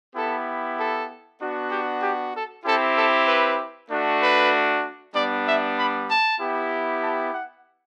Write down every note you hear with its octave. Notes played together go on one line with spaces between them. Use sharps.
B3 E4 G4 A4
A4
B3 D4 F#4
G4
G4
A4
C4 E4 G4 A4
A4
B4
A3 D4 F#4
B4
G3 B3 D4 D5
E5
B5
A5
B3 E4 G4
A5
F#5